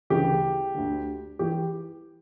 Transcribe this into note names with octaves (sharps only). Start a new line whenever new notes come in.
D2 C#3 E3 G4
D2 D3
E3 G4